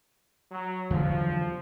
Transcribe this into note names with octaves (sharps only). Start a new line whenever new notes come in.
F#3
E2 D3 F3 F#3